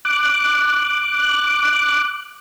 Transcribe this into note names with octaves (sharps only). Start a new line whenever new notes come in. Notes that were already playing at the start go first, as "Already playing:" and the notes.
D6 F#6